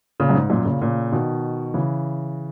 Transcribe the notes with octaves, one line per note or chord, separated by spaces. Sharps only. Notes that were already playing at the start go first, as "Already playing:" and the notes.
A#2 C#3
F#2
G#2
F#2 A#2
A#2 C#3
A#2 C#3
B2 D#3
C#3 E3